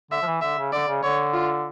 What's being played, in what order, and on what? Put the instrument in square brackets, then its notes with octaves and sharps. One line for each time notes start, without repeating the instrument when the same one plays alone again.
[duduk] D3 [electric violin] E5
[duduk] F3
E3
[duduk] D3 [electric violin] E5
[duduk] C#3
[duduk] D3 [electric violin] D5
[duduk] C#3
[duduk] D3 [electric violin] C#5
[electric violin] F4